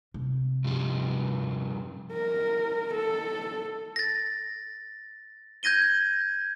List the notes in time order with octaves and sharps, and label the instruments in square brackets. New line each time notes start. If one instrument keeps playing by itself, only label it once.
[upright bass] C3
[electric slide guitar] G2 F3 G3
[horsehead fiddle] A#4
A4
[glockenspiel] A6 A#6
G6 G#6 A#6 D#7 G7